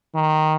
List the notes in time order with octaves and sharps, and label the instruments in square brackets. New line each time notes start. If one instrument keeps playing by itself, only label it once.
[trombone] D#3